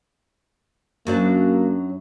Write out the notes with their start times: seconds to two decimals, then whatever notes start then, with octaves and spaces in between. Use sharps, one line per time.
1.07 F#2 F#3 A#3 D4